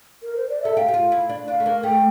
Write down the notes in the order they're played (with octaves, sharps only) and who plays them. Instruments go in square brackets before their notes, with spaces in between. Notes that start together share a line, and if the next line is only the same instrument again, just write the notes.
[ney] A#4
C5
D5
[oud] A4 [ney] E5
[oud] G4 [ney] F5
[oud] G4
F4
E4
D4
[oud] D4 [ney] F5
[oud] A3
A#3
[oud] A3 [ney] G5